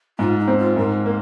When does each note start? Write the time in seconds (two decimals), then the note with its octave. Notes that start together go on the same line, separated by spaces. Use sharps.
0.19 G#2 F4
0.38 D#4
0.48 C4
0.57 F4
0.76 G#2 A#4
1.06 A#3